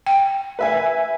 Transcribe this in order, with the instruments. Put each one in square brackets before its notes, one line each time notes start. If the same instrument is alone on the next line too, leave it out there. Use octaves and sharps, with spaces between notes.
[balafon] G5
[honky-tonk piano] B4 E5 G#5